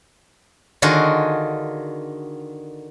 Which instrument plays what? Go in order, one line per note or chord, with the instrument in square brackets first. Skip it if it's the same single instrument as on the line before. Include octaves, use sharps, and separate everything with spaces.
[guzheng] D3 D#3 F4 F#4 G#4